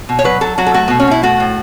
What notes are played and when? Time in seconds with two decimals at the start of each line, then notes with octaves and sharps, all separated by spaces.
0.09 B2
0.19 C#5
0.24 F#3 B4
0.41 F#3 A4
0.58 F#3 F#4
0.66 A4
0.74 A3 F#4
0.88 B2 B3
1.00 C#4
1.07 B2 E4
1.23 A3 F#4
1.40 A2